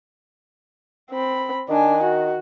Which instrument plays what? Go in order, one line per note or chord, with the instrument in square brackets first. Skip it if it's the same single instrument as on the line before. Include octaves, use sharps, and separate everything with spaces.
[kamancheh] C4 B5
[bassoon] D#3 [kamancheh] D4 G#5
[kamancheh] F#4